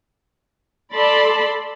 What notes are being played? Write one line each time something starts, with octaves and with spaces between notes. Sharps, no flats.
A4 D5 A5 B5 C6